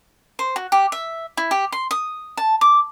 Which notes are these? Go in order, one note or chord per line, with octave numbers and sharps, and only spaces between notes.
C5
F#4
G4
E5
E4
G4
C6
D#6
A5
D6